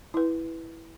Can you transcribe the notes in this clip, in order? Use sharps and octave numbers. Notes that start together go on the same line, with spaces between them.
E4 B4